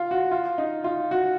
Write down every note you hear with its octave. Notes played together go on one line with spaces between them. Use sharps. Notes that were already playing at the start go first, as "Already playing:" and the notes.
Already playing: F4
F#4
F4
D#4
F4
F#4